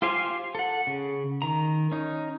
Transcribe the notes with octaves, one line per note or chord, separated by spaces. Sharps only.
F4 G4 C5 F5 G#5
A4 F#5
C#3
D#3 A#5
C#4 D#4